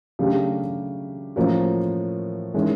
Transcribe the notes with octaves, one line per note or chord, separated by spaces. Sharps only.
C#3 F#3 A3 D4 G4
A2 F3 A#3 C#4 F#4
D#3 G#3 C#4 E4